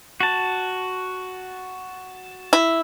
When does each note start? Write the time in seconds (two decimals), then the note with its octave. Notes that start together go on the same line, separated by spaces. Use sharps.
0.20 F#4 A5
2.53 E4